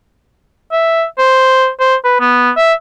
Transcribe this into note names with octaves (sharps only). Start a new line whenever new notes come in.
E5
C5
C5
B4
B3
E5